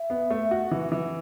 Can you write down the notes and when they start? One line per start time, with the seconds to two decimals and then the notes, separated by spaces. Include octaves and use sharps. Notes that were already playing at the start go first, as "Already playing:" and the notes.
Already playing: E5
0.10 B3
0.30 A3
0.51 F#4
0.71 E3
0.92 E3